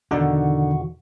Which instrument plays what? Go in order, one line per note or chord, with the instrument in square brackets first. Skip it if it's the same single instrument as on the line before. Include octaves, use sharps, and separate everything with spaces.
[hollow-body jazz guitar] E2 B2 D#3 [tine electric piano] D3 D#4 [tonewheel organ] F#4